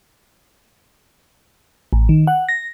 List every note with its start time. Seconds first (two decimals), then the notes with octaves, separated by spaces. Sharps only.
1.93 A1
2.09 D#3
2.27 F#5
2.49 A#6